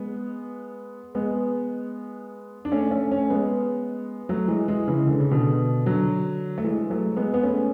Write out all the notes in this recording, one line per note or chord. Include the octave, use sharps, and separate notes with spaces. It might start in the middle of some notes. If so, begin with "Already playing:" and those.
Already playing: G#3 B3
G#3 B3
D4
A3 C#4
A3 C#4
A3 C#4
G#3 B3
F#3 A3
E3 G#3
E3 G#3
C#3 E3
D3
C#3
B2 D3
D3 F#3
A3
E3 G#3
F#3 A3
G#3 B3
B3
A3 C#4